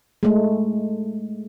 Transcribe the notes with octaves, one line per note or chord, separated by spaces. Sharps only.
G#3 A3